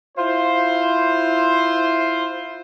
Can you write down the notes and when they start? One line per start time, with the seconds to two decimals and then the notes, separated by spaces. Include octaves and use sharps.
0.17 E4 F4 C5